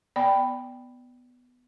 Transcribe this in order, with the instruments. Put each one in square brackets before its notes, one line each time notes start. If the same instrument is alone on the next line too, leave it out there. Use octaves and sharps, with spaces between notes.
[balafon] B3 D5 G5 B5